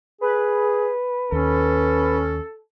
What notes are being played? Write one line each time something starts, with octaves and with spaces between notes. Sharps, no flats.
G#4 B4
D#2 C#4 A4